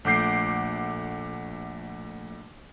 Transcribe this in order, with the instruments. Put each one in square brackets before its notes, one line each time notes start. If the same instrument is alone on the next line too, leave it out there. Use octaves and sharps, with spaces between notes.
[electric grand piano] A#1 A3 F#5 D6 G6 C7